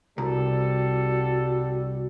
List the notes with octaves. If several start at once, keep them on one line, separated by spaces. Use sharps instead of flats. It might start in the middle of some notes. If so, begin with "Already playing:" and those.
C2 G3 F#4 A4